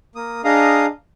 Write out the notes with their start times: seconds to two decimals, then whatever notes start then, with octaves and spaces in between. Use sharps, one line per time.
0.16 A#3 D#6
0.44 D4 G#4 D#5 F5 A#5 D#6